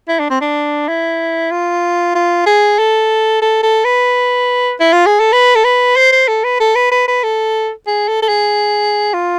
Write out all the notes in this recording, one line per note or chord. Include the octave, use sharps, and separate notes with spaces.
E4
D4
C4
D4
E4
F4
F4
G#4
A4
A4
A4
B4
E4
F4
G#4
A4
B4
A4
B4
C5
C5
A4
B4
A4
B4
B4
B4
A4
G#4
A4
A4
G#4
F4